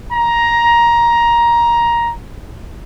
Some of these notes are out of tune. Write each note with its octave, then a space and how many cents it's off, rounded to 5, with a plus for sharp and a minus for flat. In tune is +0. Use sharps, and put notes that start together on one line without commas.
A#5 +15